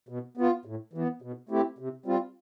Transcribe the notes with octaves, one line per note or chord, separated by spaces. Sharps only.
B2
B3 F4
A2
E3 B3
B2
A3 C4 E4 G4
C3
G3 C4 F4